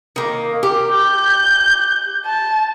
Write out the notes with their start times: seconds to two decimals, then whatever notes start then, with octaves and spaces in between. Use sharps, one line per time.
0.16 D#3 A#3
0.63 G4 A#4
0.93 G6
2.25 A5